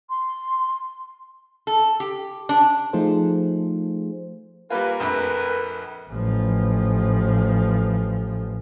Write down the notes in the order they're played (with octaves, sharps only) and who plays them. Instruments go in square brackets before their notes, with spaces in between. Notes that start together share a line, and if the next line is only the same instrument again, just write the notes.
[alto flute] C6
[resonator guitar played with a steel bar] A4
G4
D4
[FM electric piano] F3 A3 D#4 F4 G#4 C5
[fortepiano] G3 A#3 F4 [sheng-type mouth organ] A#4 G#5 [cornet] B4
[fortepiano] A#1 F2 A3 [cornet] B4
[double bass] A1 F3